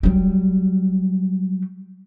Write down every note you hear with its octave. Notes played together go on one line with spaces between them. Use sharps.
F#3 G3